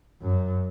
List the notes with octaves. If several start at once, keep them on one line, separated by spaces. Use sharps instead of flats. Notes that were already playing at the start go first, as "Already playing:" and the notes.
F#2